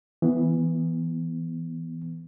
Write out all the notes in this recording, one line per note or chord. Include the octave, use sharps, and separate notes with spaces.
E3 B3